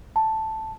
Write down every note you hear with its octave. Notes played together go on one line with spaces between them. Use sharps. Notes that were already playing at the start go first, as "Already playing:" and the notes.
A5